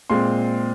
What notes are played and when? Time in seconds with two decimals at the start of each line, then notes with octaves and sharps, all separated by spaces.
0.10 A#2 G#3 C4 C6